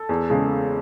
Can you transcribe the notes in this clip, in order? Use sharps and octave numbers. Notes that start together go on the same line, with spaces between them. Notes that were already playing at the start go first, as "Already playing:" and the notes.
Already playing: A4
E2
C#3 G#3